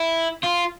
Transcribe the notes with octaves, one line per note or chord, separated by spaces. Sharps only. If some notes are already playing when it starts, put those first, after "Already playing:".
Already playing: E4
F4